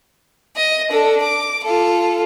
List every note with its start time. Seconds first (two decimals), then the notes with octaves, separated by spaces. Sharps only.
0.56 D#5
0.90 D4 A4
1.23 D6
1.64 F4 A4